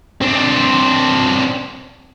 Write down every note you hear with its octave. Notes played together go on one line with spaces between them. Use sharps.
C4 D4